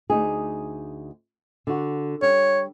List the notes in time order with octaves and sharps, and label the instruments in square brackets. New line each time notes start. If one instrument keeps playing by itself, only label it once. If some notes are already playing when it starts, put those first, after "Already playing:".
[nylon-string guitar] D2 D#4 G#4
D3 F#4
[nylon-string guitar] G3 [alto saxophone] C#5